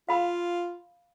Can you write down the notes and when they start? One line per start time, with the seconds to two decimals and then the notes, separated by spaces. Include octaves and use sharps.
0.09 F4 F5 B5